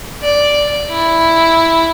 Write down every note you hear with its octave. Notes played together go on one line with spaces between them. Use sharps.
D5
E4